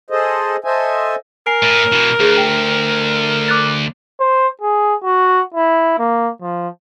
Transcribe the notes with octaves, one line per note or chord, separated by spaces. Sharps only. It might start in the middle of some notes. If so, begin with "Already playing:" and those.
G#4 A4 C5 D#5
A4 C5 D#5 E5 G#5
A#4 G#5 C7 D7
A2
B2 E3
D2 G#4
G5
D6 F#6 A6
C5
G#4
F#4
E4
A#3
F3